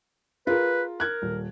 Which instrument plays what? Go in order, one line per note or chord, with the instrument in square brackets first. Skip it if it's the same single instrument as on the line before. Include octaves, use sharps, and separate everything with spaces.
[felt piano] F4 G#4 A#4 [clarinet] B4
[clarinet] A#4 [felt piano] F#6 G#6
[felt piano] D#1